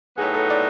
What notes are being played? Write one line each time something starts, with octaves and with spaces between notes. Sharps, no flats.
A2 F#3 B3 D#4 G#4
A4
D5